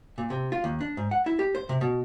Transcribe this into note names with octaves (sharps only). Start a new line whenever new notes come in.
A#2
C3
F4
D#2
D4
G#2
F#5
E4
G4
C5
C3
B2